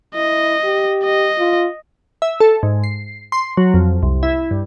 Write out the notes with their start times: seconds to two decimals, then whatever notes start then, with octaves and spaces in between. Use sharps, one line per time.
0.15 E4 D#5
0.64 G4
1.04 D#5
1.39 F4
2.22 E5
2.40 A4
2.63 G#2
2.84 C7
3.32 C6
3.57 F#3
3.74 F2
4.03 C2
4.23 E4
4.51 G2